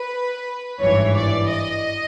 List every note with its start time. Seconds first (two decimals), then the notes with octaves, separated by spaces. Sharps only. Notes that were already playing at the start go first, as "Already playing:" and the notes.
Already playing: B4
0.81 G#1 G2 E3 C#5
1.15 D5
1.50 D#5